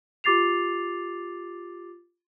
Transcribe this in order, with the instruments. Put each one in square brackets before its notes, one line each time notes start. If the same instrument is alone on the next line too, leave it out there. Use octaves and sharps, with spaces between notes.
[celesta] F4 G4 D6 A6 C7 F7